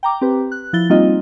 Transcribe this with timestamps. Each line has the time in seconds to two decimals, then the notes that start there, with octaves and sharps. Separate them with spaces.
0.03 G5 A#5 D6
0.21 C4 G4 B4
0.52 F#6
0.73 F3 E4 A6 G7
0.90 G3 A#3 C4 D#4 F4 D#5